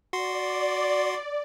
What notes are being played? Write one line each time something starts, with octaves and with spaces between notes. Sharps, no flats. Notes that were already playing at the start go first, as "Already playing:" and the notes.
F#4 D5 C6